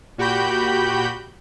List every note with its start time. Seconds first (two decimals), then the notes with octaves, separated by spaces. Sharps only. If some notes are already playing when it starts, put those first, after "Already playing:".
0.18 A#2 F#4 G4 G5 B5 G6